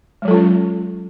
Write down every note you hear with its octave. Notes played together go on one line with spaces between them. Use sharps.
F#3 G#3 C#4 F4 A4